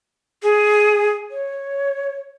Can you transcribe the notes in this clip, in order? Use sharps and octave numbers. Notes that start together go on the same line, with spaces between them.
G#4
C#5